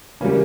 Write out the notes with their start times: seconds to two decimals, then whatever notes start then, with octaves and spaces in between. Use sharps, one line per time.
0.21 C#3 E3 G3 A#3 C#4